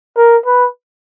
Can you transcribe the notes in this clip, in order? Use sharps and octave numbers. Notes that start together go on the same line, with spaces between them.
A#4
B4